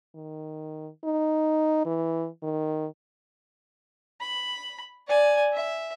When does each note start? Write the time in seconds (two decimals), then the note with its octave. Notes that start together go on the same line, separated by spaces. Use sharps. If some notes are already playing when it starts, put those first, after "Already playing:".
0.16 D#3
1.04 D#4
1.85 E3
2.43 D#3
4.21 B5
5.08 D5 G#5
5.53 E5